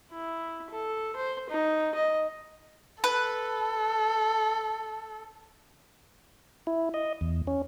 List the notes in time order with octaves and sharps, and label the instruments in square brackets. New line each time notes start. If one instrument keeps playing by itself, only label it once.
[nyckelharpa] E4
A4
C5
D#4
D#5
[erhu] A4 [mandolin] B4
[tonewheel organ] E4
D#5
E2
C#4